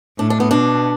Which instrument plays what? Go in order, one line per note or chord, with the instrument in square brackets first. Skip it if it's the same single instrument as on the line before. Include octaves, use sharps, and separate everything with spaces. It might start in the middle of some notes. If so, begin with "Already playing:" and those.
[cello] A2 [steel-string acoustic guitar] D4
[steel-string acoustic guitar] D4
B3
[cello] B2 [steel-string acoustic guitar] D4